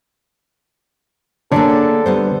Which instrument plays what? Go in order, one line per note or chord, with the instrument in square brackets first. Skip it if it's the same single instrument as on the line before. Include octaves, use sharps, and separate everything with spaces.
[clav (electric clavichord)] D3 D4 [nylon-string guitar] A#3 G#4 C#5 [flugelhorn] A4
[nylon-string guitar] G3 B3 C5